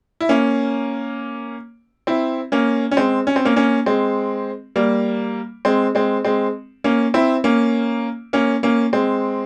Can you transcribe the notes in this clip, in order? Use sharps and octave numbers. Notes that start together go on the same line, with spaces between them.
E4
A#3 C#4
C4 E4
A#3 C#4
C#4
G#3 C4
C#4
C4
A#3 C#4
A#3 C#4
G#3 C4
G3 A#3
G#3 C4
G#3 C4
G#3 C4
A#3 C#4
C4 E4
A#3 C#4
A#3 C#4
A#3 C#4
G#3 C4